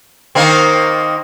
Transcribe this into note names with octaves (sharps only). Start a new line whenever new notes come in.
D#3 A#3 C4